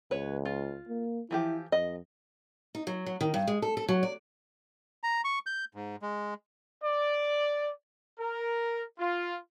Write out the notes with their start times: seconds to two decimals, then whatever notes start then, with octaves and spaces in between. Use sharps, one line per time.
0.11 C#2 B4 C#5
0.45 F4
0.89 A#3
1.31 E3 F3 E4 G4
1.72 F2 D#5
2.75 D#4
2.87 F#3
3.06 F#3
3.21 D#3
3.34 G2
3.47 G#3
3.62 A4
3.77 A4
3.89 F#3
4.03 D5
5.03 A#5
5.25 C#6
5.46 G6
5.75 G#2
6.02 G#3
6.84 D5
8.19 A#4
8.99 F4